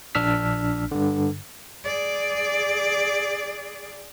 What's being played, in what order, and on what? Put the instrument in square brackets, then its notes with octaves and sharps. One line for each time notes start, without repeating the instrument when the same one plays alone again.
[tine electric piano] A#1 D4 E6 F6 B6
G2 D3
[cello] G#4 D5